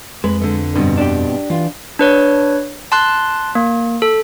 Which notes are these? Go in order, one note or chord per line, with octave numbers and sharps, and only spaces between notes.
F2 G#3 B4
D3 A3
G2 B2 D3 C4
D4 G4
E3 F4
D4 B4 C#5
A5 C6 F#6
A#3
A4